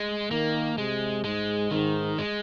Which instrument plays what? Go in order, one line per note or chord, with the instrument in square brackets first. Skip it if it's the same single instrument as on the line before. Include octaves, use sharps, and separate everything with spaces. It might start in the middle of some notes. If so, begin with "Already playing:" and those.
Already playing: [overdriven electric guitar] G#3
[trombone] D#3 [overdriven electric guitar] A#3
[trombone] C3 [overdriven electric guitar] G#3
[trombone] G#2 [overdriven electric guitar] G#3
[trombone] G#2 [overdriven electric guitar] D#3
[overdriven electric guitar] G#3